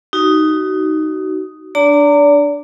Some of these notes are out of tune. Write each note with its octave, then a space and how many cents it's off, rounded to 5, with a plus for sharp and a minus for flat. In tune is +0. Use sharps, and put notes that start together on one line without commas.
D#4 +0 F#4 +30
D4 +0 D5 -30 A#5 -30